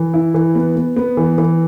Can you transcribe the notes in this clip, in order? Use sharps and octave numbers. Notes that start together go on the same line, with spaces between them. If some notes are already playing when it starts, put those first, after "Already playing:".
Already playing: E3
E4
E3
B3
B3
B3
E3
E3